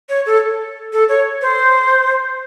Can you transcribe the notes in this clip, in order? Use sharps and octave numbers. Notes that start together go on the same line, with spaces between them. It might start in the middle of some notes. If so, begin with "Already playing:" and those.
C#5
A4
A4
C#5
C5